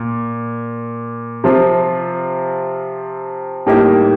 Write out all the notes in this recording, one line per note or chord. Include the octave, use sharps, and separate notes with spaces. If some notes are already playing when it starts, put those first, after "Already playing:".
Already playing: A#2
C3 F3 C4 F4
A2 G3 A#3 D#4 G4